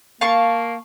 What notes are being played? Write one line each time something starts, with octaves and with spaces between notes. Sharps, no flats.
A#3 F5 A5 C#6